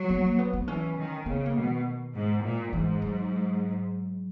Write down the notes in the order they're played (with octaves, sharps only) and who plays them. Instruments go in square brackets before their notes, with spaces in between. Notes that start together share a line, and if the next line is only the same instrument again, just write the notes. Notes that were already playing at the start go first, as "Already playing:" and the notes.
Already playing: [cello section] F#3
[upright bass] B3
A#3
B3
B3
[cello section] E3 [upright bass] C#4
[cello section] D#3
[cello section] C#3 [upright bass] B3
[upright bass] A#3
[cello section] B2
[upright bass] D#3
[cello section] G#2
A#2
[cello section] G#2 [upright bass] E3
[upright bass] F#3